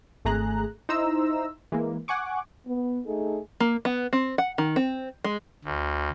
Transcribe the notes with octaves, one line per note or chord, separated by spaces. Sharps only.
G#1 A3 G#4 A#5 F#6
D#4 E4 C5 A#5 E6
E3 G#3 A#3
F#5 G#5 C#6 D6
B3
A3 D#4 G#4 A4
A#3
B3
C4
F#5
D#3
C4
G#3
D2